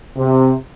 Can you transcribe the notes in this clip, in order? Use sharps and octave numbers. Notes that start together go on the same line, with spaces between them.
C3